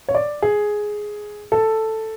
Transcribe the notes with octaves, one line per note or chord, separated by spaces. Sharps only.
C#5
D5
G#4
A4